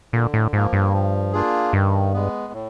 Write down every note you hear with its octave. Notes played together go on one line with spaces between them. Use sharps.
A#2 D3
A2
G#2 F3 A#3
G2
F3
A#3 D4 F4 G#4
G2 D#3
G#3 B3
A2